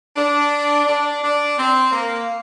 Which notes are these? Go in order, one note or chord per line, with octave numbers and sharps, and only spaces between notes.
D4
D4
D4
C4
A#3